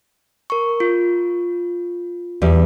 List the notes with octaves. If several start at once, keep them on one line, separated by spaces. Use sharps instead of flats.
A#4 C#6
F4
E2 G3